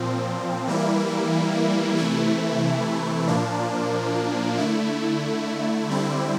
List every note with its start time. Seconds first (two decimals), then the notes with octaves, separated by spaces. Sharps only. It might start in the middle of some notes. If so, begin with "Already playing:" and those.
Already playing: A#2 F3 C4
0.67 E3 G3 A#3 E4
1.97 C3 E3 A3 E4
3.27 A#2 F3 A#3 D4
4.58 D3 A3 E4
5.88 D3 G3 C4 E4